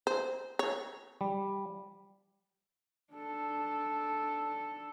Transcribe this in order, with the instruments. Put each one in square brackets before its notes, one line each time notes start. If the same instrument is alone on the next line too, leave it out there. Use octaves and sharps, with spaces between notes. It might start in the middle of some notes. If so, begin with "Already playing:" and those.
[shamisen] C5
C#5
[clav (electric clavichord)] G3
[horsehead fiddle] D4 A4